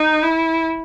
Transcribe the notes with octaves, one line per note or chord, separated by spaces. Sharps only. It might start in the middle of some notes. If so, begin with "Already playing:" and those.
Already playing: D#4
E4